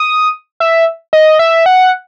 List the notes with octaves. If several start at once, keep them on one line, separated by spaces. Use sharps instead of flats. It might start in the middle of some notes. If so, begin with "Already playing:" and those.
Already playing: D#6
E5
D#5
E5
F#5